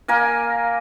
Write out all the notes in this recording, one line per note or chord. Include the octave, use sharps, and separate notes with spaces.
A#3 A#4 G#5